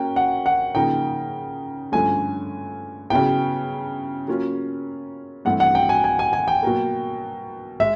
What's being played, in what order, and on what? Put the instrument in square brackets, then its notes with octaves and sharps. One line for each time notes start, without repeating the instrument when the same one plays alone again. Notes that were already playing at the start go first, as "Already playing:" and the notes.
Already playing: [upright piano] A#3 C#4 F#4 A#4 [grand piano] G5
[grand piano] F#5
F#5
[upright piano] C#3 F3 A#3 D#4 [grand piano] G5
[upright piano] G2 D3 F3 A3 C#4 [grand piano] G#5
[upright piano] C#3 F#3 B3 E4 [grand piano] G5
[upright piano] F#3 A#3 C#4 F4
[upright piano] G2 E3 A3 C4 [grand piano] F#5
[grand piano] F#5
G5
G#5
G#5
G#5
G#5
G5
[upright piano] B2 F#3 A#3
[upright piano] G#3 [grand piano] E5